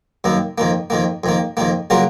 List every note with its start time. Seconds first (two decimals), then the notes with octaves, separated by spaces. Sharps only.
0.24 F#2 D#3 A#3
0.58 F2 D#3 A#3
0.90 F2 D#3 A#3
1.24 F2 D#3 A#3
1.57 F2 D#3 A#3
1.90 C#3 F#3 A#3 F4 A#4